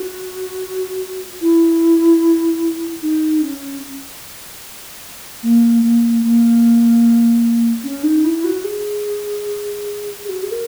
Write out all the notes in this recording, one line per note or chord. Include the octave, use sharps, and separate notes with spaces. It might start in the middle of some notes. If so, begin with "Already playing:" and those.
Already playing: F#4
E4
D#4
C#4
A#3
A#3
A#3
C#4
D#4
E4
F#4
G#4
G#4
F#4
G#4
A#4